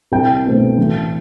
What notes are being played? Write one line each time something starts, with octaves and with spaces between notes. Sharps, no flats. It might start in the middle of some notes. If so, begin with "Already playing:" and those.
C2 G5
B2 A3 C4
A1